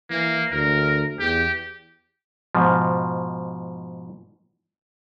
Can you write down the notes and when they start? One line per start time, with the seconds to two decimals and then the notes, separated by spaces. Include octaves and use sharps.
0.10 E3 A#3
0.51 D2 A#4
1.20 E2 G4
2.55 G#2 B2 F3